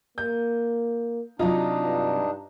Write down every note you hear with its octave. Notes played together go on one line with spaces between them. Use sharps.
A#3 G6
C3 F#3 D4 D#4 F4 D#5 A#5
G2